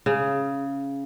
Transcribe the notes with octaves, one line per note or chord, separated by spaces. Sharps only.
C#3